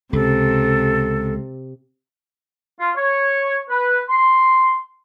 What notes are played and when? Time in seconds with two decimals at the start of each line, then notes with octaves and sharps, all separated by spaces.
0.13 C#2 C3 A4
2.79 F4
2.95 C#5
3.69 B4
4.07 C6